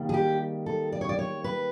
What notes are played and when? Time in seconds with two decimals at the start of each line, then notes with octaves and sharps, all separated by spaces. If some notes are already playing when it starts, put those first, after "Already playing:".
Already playing: D#3 G3 A#3
0.09 G#4
0.14 G4
0.66 A4
0.92 D5
1.01 C#5
1.09 D5
1.19 C#5
1.44 B4